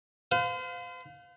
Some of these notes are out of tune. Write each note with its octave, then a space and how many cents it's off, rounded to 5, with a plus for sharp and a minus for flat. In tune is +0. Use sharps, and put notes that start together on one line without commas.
C5 -40 F5 +20